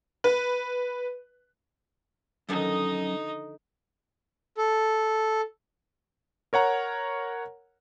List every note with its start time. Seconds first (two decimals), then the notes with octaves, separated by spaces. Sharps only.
0.24 B4
2.49 F#2 D3 D#3 F3 D#4 D#5
4.57 A4
6.53 A#4 C#5 F#5 A#5